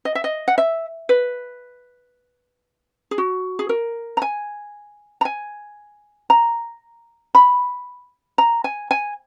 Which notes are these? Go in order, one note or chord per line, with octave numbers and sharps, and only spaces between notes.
D#5
E5
D#5
F#5
E5
B4
G#4
F#4
G#4
A#4
A#5
G#5
A#5
G#5
A#5
B5
A#5
G#5
G#5